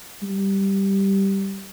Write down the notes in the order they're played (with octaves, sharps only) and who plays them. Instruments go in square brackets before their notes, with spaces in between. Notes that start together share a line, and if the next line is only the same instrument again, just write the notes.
[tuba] G3